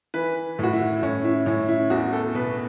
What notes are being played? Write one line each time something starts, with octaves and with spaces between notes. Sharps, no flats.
E3 B4
A2 F#4
E4
A2 C#4
E4
A2 C#4
E4
E2 F#4
A4
B2 B4